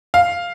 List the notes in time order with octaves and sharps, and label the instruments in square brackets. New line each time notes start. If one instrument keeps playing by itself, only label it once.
[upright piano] F5